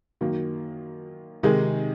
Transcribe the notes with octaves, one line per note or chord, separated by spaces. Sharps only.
F#2 D#3 F#3 A#3
C3 D#3 G#3 D#4 G#4